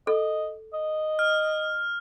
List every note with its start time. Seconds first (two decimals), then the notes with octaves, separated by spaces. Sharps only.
0.07 A4 D#5
0.73 D#5
1.19 F6